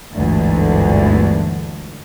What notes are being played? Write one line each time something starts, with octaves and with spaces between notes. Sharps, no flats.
G1 D2 G#2 D3 E3